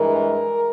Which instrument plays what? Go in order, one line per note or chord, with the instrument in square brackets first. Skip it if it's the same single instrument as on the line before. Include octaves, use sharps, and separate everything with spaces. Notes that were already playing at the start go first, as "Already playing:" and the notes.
Already playing: [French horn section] G2 E3 G#3 A#4